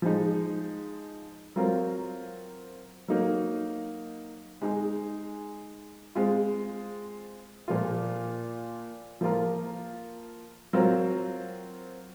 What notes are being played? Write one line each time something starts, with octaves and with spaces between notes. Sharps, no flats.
F3 G#3 D#4
F#3 C4 F4 A#4
F#3 A#3 D#4
G#3 D#4 G#4
G#3 C4 F4
A#2 F3 A#3 F4
F3 A#3 F4 A#4
F#3 C4 F4 A#4